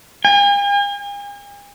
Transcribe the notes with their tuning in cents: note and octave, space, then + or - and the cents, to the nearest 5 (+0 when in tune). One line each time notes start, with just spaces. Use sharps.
G#5 -45